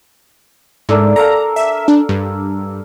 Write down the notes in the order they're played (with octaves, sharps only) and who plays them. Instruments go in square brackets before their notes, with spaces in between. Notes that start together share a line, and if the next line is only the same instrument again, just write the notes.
[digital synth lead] G#2 [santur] A3 D4 A#4
[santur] A4 A#4 F5 [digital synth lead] A#5
[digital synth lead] E5
D4
G2